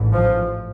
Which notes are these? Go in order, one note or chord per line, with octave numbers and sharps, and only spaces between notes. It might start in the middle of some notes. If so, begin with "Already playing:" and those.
Already playing: A1 G#2
F3